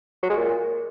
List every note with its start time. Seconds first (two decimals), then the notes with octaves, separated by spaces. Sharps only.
0.23 F#3
0.30 G#3
0.36 A#2